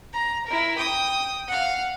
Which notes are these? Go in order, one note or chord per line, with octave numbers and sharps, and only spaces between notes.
A#5
E4 A#4
G5 D#6
F5 F#5